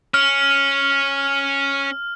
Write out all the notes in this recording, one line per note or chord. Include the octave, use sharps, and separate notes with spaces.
C#4 F6